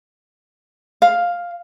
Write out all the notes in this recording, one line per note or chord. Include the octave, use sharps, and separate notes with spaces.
F5